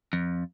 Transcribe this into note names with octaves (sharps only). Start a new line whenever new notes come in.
F2